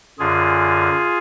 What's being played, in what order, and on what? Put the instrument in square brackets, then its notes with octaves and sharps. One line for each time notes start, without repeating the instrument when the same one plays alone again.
[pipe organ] F#2 D3 F4 G#4